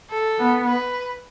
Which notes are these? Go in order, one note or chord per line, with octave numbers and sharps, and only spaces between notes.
A4
B3
B4